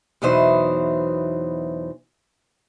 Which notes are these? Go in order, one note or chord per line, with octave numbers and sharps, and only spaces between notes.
E2 B2 E3 F#3 D#4 C5